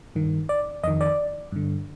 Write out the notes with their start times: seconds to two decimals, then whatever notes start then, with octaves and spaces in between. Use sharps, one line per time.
0.15 G2 D#3
0.49 D5
0.83 F2 D#5
0.87 D#3
1.01 D5
1.52 G2 D3